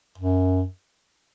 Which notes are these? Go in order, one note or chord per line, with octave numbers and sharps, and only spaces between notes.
F#2